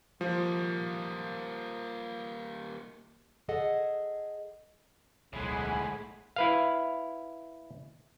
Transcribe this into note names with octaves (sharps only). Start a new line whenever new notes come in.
F3 G3 A#3
G#4 A4 D#5 F#5
D1 B1 A2 D3 G#3 B3 G#5 B5
E4 B4 F5